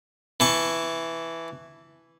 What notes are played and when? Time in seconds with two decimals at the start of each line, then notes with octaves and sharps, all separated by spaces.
0.40 E3 A5 C#6